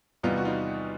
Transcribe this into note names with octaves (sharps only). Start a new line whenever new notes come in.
E2 C3 D#3 G3 B3 D#4 F4
F#4
D#4 F4